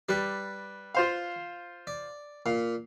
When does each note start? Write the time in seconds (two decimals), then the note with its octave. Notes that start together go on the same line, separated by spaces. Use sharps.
0.09 G3 B4 D5
0.95 F4 C5 F5
1.87 D5
2.46 A#2 F5